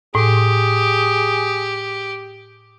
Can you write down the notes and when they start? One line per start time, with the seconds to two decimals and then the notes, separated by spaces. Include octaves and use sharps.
0.15 A2 G4 G#4